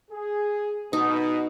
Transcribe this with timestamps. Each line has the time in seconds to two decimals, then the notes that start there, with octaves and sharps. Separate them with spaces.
0.11 G#4
0.93 B2 D#4